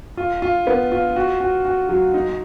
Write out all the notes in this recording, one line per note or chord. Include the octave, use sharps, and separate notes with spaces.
F4
F4
B3
F4
F#4
F#4
F#4
F#3
D#4